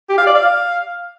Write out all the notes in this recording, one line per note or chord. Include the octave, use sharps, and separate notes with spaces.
G4
F5
D5
F5